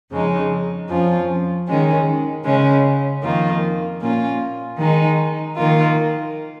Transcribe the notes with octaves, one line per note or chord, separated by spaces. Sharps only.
F2 C#3 G#3 D#4
F2 F3 C#4 F4
D#3 G#3 C#4
C#3 G#3 C#4
F2 D#3 A#3 F4
A#2 A#3 C#4 F4
D#3 G#3 D#4
D#3 A#3 F4